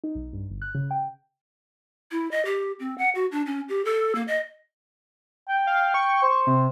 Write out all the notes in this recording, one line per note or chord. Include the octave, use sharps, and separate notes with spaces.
D#4
B1
G2
G1
F#6
C#3
G5
E4
D#5
G4
C4
F#5
F#4
D4
C#4
G4
A4
A#3
D#5
G5
F5
C#6
C5
C3